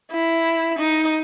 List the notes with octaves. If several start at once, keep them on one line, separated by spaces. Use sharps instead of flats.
E4
D#4